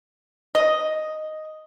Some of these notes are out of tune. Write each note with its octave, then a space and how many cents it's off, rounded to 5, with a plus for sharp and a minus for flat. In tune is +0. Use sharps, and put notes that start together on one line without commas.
D#5 +0